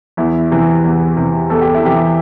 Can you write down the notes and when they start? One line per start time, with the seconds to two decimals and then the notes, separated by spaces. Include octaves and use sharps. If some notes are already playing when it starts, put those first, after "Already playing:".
0.17 E2 E4
0.51 C3 E3
0.84 E2
1.17 C3 E3
1.50 E2 A4
1.61 G4
1.74 E4
1.83 C3 E3 G4